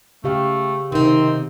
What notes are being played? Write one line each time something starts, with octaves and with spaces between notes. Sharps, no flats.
C#3 A3 G4 F5
C3 D#3 C4 D#4